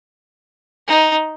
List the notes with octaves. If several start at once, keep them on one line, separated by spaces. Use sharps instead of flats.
D#4